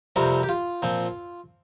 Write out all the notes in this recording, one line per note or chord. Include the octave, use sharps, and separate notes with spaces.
F2 C3 G3 C4 A#4
G4
F4
A#2 F3 C4